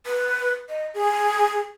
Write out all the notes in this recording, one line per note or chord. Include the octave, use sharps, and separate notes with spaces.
B4
D#5
G#4